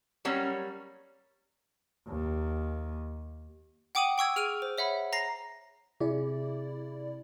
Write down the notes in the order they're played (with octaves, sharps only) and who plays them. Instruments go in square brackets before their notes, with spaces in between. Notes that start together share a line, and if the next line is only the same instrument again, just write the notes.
[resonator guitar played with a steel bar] F#3 G3 A#3 C#4
[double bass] D#2
[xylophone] F#5 G5 D6 D#6 D#7 F#7
G5 C#6 E6 G#6
G#4 F6 D7 D#7 F7
C5
C#5 E5 F#5 B5
A#5 A#6 C7
[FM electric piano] C3 E4 D5 [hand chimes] G#4